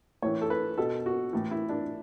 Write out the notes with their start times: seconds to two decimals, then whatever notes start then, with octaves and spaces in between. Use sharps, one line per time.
0.22 A2 E3 C#5
0.41 A4
0.50 B4
0.77 B2 A4
1.06 F#4
1.33 A2 E3
1.51 E4
1.69 D4